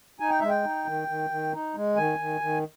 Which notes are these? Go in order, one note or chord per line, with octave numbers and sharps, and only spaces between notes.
D#4 G#5
G5
G#3 E5
G5
D#4
D#3
D#3
D#3
D#4
G#3
D#3 G#5
D#3
D#3